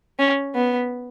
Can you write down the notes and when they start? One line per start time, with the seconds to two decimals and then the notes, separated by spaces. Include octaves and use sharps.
0.19 C#4
0.55 B3